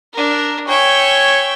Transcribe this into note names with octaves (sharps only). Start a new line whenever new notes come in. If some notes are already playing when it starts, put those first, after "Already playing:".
D4 A#4
C#5 E5 G5 G#5 C#6